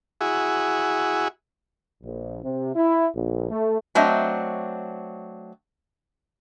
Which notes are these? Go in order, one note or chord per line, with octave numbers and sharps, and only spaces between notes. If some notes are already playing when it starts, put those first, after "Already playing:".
E4 F#4 G#4
A#1
C3
E4
A#1
A3
F#3 A3 C4 D4 D#5 A#5